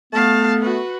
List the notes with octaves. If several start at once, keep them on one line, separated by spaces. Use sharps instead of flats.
A3 B3 F5 A5
F#4 B4